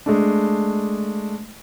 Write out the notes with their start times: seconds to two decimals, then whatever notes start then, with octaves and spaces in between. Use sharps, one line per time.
0.06 G#3 A3 D4